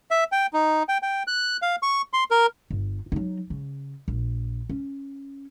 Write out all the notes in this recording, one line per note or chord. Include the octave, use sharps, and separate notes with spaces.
E5
G5
D#4
G5
G5
F#6
F5
C#6
C6
A#4
G1
F#3 D#4
C#3
A#1
C#4